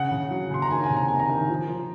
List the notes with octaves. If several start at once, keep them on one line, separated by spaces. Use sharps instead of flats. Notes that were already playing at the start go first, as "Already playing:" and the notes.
Already playing: C#3 F#5
C#3
F#3
C#3 C6
A#5
D#3 G#5
G#5
C3
A#5
D#3 G#5
A#5
D#3
F3
F3